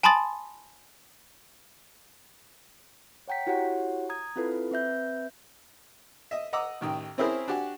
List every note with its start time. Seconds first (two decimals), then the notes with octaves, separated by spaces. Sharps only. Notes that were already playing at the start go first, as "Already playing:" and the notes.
0.03 G#5 A5 B5 C6 D#6 A6
3.28 C#5 F#5 G5 A#5 B6
3.47 E4 F#4 G4 C#5 F#5
4.09 A#5 D#6 G#6
4.36 C4 E4 F4 A4 B4
4.71 C4 B4 E5 G6
6.31 D#5 E5
6.53 D#5 F#5 A#5 D6 E6
6.81 A1 D#3 G5
7.18 C4 C#4 E4 G#4 A#4 C5
7.48 D4 F#4 G4 F#5 G#5